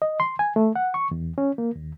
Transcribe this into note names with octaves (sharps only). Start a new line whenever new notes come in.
D#5
C6
G#5
A3
F#5
C#6
E2
C#4
A#3
D#2